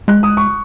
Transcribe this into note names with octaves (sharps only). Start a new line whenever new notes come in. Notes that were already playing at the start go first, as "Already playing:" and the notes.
G#3 F#6
D#6
C#6